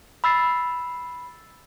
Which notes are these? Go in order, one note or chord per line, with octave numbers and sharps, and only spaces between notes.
B5 E6 A6 C7